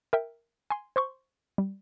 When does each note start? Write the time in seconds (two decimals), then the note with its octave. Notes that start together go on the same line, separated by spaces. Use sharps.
0.13 A#4 E5 G5
0.70 G#5 C6
0.96 C5 C6 C#6
1.58 G3